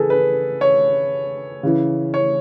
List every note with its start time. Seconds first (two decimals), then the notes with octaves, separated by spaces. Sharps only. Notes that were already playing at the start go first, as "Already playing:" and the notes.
Already playing: C#3 E3 G#4 A4 B4
0.10 B4
0.61 C#5
1.63 C#3 E3
2.14 C#5